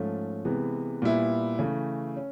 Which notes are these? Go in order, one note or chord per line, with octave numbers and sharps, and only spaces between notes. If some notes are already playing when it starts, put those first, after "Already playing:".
Already playing: G#2 F3 A3 C#4
C3 E3 G#3 B3
A#2 G3 B3 E4
C#3 E3 A3
C#4